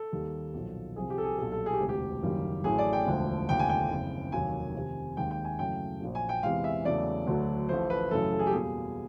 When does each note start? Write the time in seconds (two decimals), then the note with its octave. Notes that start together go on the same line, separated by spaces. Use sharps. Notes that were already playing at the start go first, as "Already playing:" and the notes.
Already playing: A4
0.12 D#2 D#3 G3
0.54 B1 A#2 F3 A#3
0.96 C2 C3 F3 G#4
1.10 G4
1.18 A4
1.24 G#4
1.38 B1 A#2 G3 A4
1.52 A4
1.66 G#4
1.73 G4
1.80 E1 D2 C3
1.89 G4
2.22 F#1 F#2 D#3 G3 A#3
2.64 A1 A2 F#3 A3 G#4
2.78 D5
2.93 G5
3.07 E1 D2 D3 F3 A3
3.49 F1 D#2 D3 F3 G5
3.59 G#5
3.69 G5
3.90 F#1 F2 C#3
4.32 F1 D#2 D#3 F#3 A#3 G#5
4.75 F2 C3 D#3
5.17 D#2 D#3 G#3 G5
5.31 G5
5.44 G#5
5.59 F#2 C#3 E3 A3 G5
6.01 A#1 A#2 F#3
6.15 G#5
6.29 G5
6.43 E2 C3 E3 G#3 F5
6.64 E5
6.85 E2 C#3 F#3 A3 D5
7.27 D2 D3 F#3 A3
7.69 A1 A2 F3 A3 C5
7.90 B4
8.11 F#2 C#3 E3 A3 A4
8.32 A4
8.39 G#4
8.47 G4
8.53 E2 B2 G3 A#3 G#4